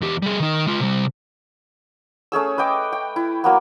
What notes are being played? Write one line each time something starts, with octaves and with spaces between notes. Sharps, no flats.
E2 G4
G3 G#4
D#3 D#4
G#3 F4
C3 G3
A3 C#4 G#4 E6
B4 D#5 G5 D6
G5
E4
F#3 A#3 B3